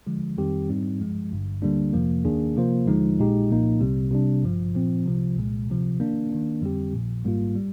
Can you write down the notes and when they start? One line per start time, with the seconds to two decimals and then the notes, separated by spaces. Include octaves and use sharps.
0.07 D3 F3 G#3
0.38 F2 D#3 G3 C4 G4
0.69 G#2 G3 C4 D#4
1.00 G2 F3 G#3
1.31 G#1 G2 D3
1.62 D2 D3 G3 A#3 D4
1.93 F2 C3 F3 A#3
2.24 D#2 D#3 A#3 D4 G#4
2.56 C3 F3 A#3 F4 C5
2.87 D#2 D3 F3 G#3 D#4
3.18 A#1 A#2 G#3 D#4 G4
3.50 C2 A#2 F3 A#3 D#4
3.80 C2 C3 G3
4.11 C3 G3 D4
4.43 G#1 G2 F3
4.75 A#2 F3 C4
5.06 C2 C3 F3
5.37 C2 A#2 G#3
5.68 D2 C3 F3
5.99 D#3 A#3 D4
6.30 D#3 A#3 D4
6.61 F2 D3 G3 C4 G4
6.93 A#1 A#2 F3
7.23 G#1 G#2 G3 A#3 F4
7.55 G3